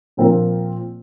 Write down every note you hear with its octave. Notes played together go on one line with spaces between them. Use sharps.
A#2 F3 C4 F4 A#4